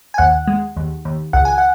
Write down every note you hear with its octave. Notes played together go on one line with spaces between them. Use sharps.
G#5
D#2 F#5
G#3
D#2
D#2
C#2 F#5
G#5
F#5